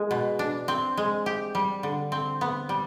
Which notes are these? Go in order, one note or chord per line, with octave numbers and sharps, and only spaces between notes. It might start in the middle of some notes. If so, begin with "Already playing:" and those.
Already playing: G#3
B2
D4
C4
G#3
G4
G3
D3
C4
B3
G3